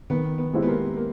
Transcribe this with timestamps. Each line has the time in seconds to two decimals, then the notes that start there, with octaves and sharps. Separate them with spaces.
0.10 D#3 B3
0.38 B3
0.53 G#3 C4 E4 G4
0.62 B3
0.68 A#3
0.97 A#3